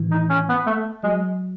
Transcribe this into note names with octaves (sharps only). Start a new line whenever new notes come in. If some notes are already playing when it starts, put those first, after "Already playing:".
Already playing: A2 D#3 E3
D#4
C#4
B3
A3
F#3 G#3